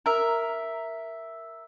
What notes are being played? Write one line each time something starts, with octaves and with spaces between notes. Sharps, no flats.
A#4 E5